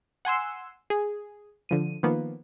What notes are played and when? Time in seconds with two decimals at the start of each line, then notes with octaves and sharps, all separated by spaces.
0.25 F#5 G#5 C6 E6
0.90 G#4
1.69 D3 F3 D#7
2.03 D#3 F3 A#3 B3